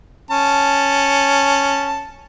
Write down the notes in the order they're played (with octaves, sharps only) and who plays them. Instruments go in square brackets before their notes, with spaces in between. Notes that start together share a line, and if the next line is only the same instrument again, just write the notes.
[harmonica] C#4 A5